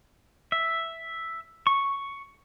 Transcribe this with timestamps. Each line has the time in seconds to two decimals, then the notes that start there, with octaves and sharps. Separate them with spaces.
0.52 E5
1.67 C#6